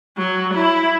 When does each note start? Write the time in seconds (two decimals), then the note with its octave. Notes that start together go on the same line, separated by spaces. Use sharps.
0.18 F#3
0.54 E4